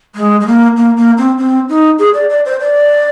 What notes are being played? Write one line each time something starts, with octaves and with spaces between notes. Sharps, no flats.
G#3
G#3
A#3
A#3
A#3
C4
C4
D#4
G#4
D5
D5
C5
D5